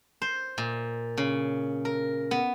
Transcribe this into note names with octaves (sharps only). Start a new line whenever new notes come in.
C5
A#2
C#3
A#4
B3